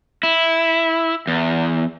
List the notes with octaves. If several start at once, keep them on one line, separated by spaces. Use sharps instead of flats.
E4
E2